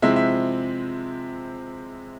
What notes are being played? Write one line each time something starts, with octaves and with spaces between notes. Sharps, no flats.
C3 F3 G#3 C4 E4 E5
E5